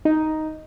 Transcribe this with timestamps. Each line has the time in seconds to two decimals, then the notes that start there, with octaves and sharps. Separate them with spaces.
0.05 D#4